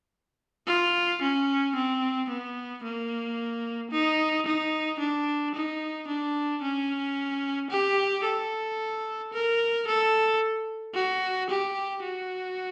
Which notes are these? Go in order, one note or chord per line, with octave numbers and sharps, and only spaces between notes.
F4
C#4
C4
B3
A#3
D#4
D#4
D4
D#4
D4
C#4
G4
A4
A#4
A4
F#4
G4
F#4